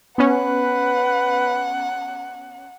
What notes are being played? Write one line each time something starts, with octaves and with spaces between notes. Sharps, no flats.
B3 C#4 B4 F#5